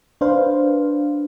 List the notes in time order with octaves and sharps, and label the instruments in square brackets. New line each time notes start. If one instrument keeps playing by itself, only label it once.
[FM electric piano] D4 B4 C5 F5